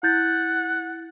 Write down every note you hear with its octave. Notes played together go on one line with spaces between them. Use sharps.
E4 F#5 G6 A6